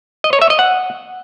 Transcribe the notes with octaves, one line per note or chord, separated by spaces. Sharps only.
D#5
C#5
E5
D#5
F#5